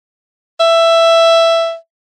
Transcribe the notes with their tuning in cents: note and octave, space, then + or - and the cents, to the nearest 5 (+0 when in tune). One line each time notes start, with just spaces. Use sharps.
E5 +10